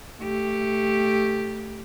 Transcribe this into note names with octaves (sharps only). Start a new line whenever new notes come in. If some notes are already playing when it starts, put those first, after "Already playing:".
A3 G4